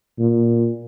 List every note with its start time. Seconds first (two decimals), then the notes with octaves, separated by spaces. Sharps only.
0.19 A#2